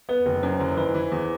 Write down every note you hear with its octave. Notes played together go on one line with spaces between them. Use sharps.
B3 B4
F#1
F#2 C5
F#1
E3 B4
E3
E2